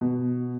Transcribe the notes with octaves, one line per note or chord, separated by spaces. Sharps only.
B2